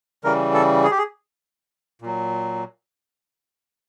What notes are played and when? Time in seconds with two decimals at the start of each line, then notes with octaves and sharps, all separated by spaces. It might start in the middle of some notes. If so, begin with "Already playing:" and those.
0.24 C#3 E3 G3 A#4
0.54 A4
0.84 G#4
0.91 G4
0.98 G#4
2.02 A#2 F#3